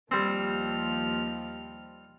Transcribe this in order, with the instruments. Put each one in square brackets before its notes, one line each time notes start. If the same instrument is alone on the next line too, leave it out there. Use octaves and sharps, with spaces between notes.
[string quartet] D#2 F3 F6 [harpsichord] G3 C4